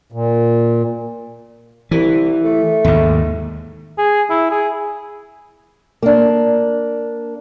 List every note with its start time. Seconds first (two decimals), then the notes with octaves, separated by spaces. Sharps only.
0.12 A#2
1.91 C2 E3
2.45 A3
2.84 D#2 G#2
3.98 G#4
4.30 E4
4.51 G#4
6.03 A#3 D4